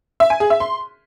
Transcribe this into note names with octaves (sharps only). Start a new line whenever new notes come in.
E5
G#5
G#4
E5
C6